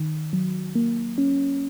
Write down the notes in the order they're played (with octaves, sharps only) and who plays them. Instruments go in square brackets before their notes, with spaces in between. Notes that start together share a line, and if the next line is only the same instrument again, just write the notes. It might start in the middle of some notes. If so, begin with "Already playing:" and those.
Already playing: [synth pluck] D#3
F#3
A#3
C#4